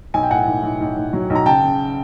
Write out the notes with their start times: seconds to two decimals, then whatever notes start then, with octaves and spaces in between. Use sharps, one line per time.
0.14 B1 G#5
0.23 G5
0.30 A2 F#5 G#5
0.47 B1
0.63 B1
0.80 B1
0.97 B1
1.13 F#3
1.30 B1
1.35 A#5
1.46 C#3 G5 A5
1.63 C#3